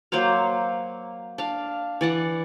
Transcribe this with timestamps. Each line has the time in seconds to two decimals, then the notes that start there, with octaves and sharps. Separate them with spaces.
0.12 F#3 A#3 C5 F5
1.38 D4 F5
2.01 E3 D5 F#5